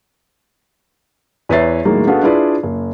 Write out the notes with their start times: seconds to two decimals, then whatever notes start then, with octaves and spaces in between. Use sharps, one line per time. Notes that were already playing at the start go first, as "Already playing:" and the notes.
1.49 E2 B4 C#5 E5 A6 C7
1.85 A2 D#3 F#3 G#3 A#3
2.07 B3 D4 F#4 G#4 A4 F5
2.22 D4 E4 F4 G#4 B4 D5
2.63 F#1